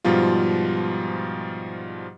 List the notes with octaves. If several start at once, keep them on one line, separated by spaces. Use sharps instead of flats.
G#2 B2 F3 G3 F4